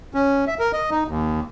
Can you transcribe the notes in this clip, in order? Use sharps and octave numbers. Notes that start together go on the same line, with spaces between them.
C#4
E5
A#4
D#5
D#4
D#2